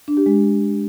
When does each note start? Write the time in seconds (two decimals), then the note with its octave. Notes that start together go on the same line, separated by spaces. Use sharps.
0.08 D4
0.17 G4
0.26 G#3